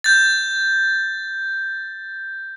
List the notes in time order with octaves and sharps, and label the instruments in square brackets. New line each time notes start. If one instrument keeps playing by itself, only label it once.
[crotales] G6 A6